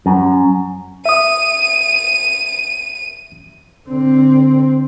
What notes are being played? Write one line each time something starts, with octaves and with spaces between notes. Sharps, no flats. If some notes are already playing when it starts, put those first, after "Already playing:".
F#2
E5 D#6 D#7
D3 C4